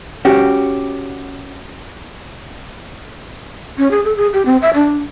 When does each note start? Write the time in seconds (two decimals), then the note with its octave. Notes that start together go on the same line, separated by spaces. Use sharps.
0.25 C#4 F#4 G4
3.77 C#4
3.91 G#4
4.05 A4
4.17 G#4
4.33 G4
4.46 C4
4.62 E5
4.74 D4